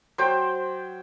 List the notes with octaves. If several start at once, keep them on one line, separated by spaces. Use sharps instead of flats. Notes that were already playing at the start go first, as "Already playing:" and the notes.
F#3 C5 G5 D6